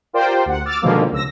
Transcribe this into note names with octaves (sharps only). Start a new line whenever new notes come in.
F4 G4 A#4 C5 D5 G5
D2 F#5
D6 E6 F6 A6
B2 D3 D#3 F3 G#3 A#3
C#2 E6 A#6